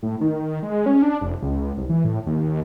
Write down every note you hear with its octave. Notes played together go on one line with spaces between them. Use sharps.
A2
D#3
G#3
C#4
D4
F1
C#2
C2
E3
A2
D#2